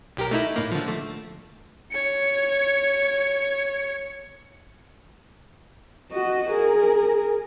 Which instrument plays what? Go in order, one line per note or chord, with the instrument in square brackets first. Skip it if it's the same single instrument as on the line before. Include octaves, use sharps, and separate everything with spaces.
[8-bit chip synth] B1 G4 A#4
A3 D#4 E4
A2 A#3
D3 F3
A3
[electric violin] C#5 C#7
[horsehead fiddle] F#4 D#5
G#4 A#4